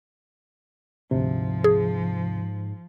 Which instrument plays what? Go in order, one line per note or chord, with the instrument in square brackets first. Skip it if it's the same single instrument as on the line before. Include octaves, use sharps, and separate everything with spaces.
[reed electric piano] D2 C3 [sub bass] G#2 [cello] F3
[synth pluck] G#4